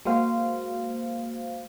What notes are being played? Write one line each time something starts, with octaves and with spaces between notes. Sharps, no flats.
G#3 A#3 F#4 C5 F5